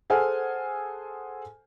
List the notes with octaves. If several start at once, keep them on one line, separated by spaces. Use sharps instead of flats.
G#4 A4 C5 F#5 G#5 F6